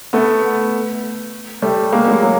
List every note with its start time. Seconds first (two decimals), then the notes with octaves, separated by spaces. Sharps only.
0.13 A3 B3
1.62 G3 A3
1.93 G#3 A#3
2.08 F#3 G#3
2.23 F#3